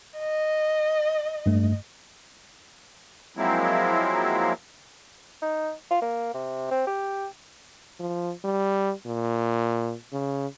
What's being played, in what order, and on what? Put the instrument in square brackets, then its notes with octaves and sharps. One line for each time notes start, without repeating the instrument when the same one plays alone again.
[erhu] D#5
[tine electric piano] G2 A3
[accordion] F3 F#3 G#3 A#3 C4 E4
[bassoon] D#4
F4
A#3
C3
C4
G4
[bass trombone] F3
G3
A#2
C#3